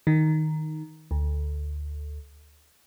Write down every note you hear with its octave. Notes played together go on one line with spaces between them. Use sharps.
D#3
D2